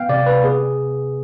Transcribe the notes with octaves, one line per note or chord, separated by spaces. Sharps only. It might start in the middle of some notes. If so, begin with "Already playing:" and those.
Already playing: B3 F5 G5
C3 D5
B4
B3 G#4